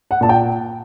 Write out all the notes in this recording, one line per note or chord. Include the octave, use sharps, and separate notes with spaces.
F#5
A#2 A5
G5